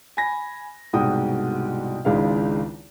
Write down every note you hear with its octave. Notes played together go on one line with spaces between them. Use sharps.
G#5 B5 A#6
C2 G#2 B2 F#4 G5 D#6
G#1 C#2 G#3 D4 E4 F5